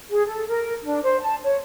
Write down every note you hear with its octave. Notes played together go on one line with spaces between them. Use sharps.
G#4
A4
A#4
D4
C5
A5
C#5